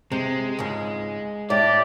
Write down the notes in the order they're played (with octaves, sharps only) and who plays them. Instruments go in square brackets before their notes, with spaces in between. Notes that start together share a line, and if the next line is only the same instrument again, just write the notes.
[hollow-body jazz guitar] C3 [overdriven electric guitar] G#3
[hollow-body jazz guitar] C#2 G#2
[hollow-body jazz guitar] A2 [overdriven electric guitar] G4 [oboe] D5